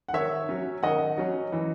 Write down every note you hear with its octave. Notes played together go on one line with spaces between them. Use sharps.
F#5
D#3 C#5 E5
F#3 C#4
D#3 D#5 F#5
F#3 C#4
E3